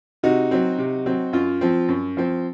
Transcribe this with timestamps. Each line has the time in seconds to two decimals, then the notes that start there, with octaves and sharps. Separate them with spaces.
0.23 C3 D#4 F#4
0.51 F#3 C4
0.78 C3
1.06 F#3 C4
1.33 F#2 F4
1.61 F3 C4
1.88 F#2
2.17 F3 C4